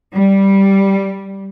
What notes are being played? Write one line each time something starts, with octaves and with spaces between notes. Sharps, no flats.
G3